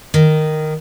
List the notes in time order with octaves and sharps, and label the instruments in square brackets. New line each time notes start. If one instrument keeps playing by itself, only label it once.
[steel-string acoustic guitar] D#3